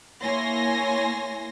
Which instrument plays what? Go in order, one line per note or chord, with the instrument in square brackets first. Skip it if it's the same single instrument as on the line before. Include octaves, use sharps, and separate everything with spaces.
[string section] A#3 E4 C#5 G#5 C6 A#6